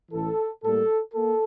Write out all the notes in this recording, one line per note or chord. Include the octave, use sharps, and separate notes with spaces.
A1 A2 E3 A4
A2 G3 A#3 A4
A#3 A4